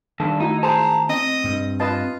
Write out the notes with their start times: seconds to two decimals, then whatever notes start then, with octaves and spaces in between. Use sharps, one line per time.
0.20 G2 D#3 A4
0.40 A3 D#4 E4 F#4
0.63 G#4 C5 A5 A#5
1.09 C4 D#5
1.44 G2
1.80 F4 B4 D#5 A5